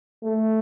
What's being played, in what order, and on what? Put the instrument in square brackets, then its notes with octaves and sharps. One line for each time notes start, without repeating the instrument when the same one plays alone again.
[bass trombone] A3